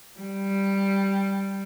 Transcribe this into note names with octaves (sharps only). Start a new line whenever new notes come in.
G3